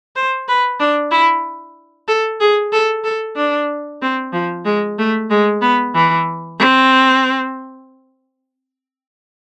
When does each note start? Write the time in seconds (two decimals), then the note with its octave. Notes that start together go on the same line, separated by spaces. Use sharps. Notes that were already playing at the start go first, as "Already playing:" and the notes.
0.16 C5
0.48 B4
0.80 D4
1.11 E4
2.08 A4
2.40 G#4
2.72 A4
3.04 A4
3.36 D4
4.02 C4
4.33 F3
4.65 G#3
4.98 A3
5.30 G#3
5.62 B3
5.95 E3
6.59 C4